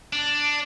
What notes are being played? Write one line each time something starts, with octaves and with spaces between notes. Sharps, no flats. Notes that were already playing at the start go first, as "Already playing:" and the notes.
D4